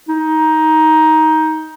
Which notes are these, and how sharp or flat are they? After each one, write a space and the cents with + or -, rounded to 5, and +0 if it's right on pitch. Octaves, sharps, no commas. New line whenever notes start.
D#4 +15